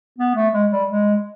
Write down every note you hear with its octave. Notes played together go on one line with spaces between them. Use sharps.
B3
A3
G#3
G3
G#3